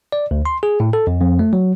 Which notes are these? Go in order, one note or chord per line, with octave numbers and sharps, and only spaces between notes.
D5
D2
C6
G#4
A2
A4
F2
F2
A3
F#3